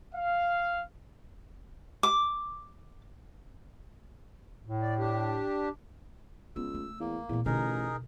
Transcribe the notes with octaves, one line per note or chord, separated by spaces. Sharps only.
F5
D6
A2
D5
D4 G4
C#2 B3 E6
A3
E2 A#3
E2 A#2 A3
A1 B2 D3 D#4 G#4 A#4